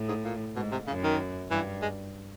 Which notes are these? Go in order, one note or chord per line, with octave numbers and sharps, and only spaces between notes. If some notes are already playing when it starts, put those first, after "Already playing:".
Already playing: A2
G#2
A#2
G#2 B2
C3
F#2 C#3
D#3
G2 E3
G#3